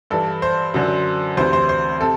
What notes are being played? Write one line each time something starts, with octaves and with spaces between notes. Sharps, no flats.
G2 E3 A4
C5
F#2 D3 F#3
D2 C3 E3 C5
C5
C5
C3 A4